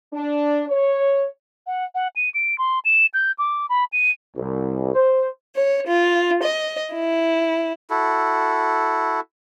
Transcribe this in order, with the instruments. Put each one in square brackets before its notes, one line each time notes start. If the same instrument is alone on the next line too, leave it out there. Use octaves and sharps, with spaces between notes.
[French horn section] D4
C#5
[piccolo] F#5
F#5
D#7
D7
C6
E7
G6
D6
B5
D#7
[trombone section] C2
C5
[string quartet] C#5
F4
D#5
E4
[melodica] E4 F#4 A4